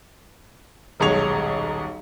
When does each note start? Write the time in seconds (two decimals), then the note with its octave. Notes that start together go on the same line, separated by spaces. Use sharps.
1.00 D#1 B1 G#3 C#5 F7